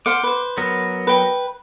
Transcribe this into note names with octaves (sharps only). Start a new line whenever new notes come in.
C5 F5 F#5 D6
B4 C5
F#3 B3 A#4
B4 G5 B5